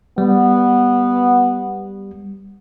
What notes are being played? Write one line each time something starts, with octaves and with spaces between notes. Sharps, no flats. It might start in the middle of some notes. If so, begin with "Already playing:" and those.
G3 B3